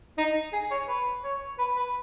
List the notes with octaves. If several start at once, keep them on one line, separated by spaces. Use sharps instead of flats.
D#4
G#4
C#5
B4
C#5
B4
B4